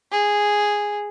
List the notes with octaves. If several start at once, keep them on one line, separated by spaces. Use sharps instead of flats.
G#4